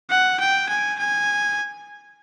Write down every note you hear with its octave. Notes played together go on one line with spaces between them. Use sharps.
F#5
G5
G#5
G#5